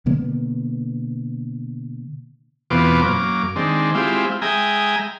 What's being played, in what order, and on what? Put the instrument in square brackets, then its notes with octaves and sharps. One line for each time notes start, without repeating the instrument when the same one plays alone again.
[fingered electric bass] B2 D3 A#3 B3
[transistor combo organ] E2 B2 B3 C4 F4 D6
F#2 A#3 D6
D#3 G#3 C4 D4
G#3 C4 E4 F4 G4
G#3 E5 G5 G#5 A#5 D#6